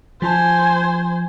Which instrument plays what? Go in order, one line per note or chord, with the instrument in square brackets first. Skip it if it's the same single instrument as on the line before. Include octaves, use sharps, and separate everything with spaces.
[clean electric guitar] F3 F4 A5 [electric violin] C5 G#5